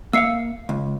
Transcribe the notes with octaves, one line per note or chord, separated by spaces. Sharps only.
A#3 E5 F5 E6 C7 C#7
C#2